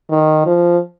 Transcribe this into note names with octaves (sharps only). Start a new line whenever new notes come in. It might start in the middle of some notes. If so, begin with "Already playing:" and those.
D#3
F3